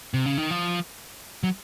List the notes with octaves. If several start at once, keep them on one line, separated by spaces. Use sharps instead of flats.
C3
C#3
D#3
F3
F#3